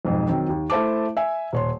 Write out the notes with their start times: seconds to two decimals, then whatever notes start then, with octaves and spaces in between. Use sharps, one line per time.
0.05 B1 F2 G#2
0.28 D#3 F#3 C4
0.49 D#2
0.70 A3 E4 C5 A5 D6
1.17 E5 G#5
1.53 D#1 C#5 C6